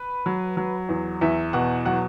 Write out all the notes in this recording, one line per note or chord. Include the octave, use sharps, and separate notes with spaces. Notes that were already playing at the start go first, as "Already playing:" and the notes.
Already playing: B4
F#3
F#3
E2
E2 E5
B2 F#5
F#3 F#5